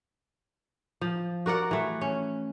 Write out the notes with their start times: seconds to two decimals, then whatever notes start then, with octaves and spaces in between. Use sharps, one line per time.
1.01 F3
1.46 F#4 A#4 D5 F#5
1.71 E3 A3
2.01 C#4